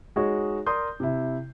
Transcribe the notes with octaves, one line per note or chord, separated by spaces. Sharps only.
G#3 D#4 F#4 G#4 C#5
A#4 D5 C6 D#6 G6
C3 E4